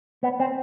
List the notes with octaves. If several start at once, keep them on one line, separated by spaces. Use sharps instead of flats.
B3
C4